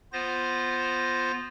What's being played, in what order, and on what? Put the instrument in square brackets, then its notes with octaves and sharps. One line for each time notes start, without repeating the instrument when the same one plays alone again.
[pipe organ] B3 F4 C5 A#6